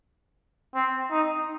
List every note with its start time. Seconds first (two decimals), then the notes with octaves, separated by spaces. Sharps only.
0.75 C4
1.11 D#4